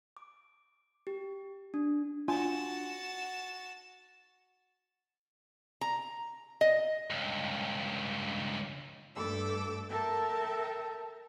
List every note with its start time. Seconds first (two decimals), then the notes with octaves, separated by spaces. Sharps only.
0.17 D6
1.07 G4
1.74 D4
2.28 D4 F4 F#4 G#5 A5
5.81 A#5
6.61 D#5
7.11 C#2 G2
9.15 G2 A3 A4 D6 E6
9.89 A4 A#4 E5 G5 A5